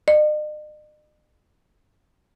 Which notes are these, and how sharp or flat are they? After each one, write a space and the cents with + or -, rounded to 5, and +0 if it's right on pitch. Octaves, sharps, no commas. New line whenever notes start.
D#5 -45